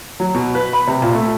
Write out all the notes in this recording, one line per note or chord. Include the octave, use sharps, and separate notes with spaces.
F#3
B2
B4
B5
C3
A#2
A3